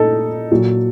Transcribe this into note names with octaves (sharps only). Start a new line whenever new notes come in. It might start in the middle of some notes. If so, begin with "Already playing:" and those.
Already playing: A#2 D#4 A4
A#2 F#3